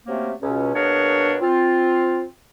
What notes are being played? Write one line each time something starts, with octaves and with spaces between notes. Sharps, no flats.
C3 F#3 A3 A#3 C4 C#4
C#2 B2 C#4
B2 A#3 D4 G#4 A#4 C#5
C4 F4